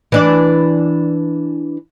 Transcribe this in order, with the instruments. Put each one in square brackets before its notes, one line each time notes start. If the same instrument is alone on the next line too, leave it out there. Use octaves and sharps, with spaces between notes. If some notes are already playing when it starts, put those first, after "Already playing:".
[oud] E3 D4 D5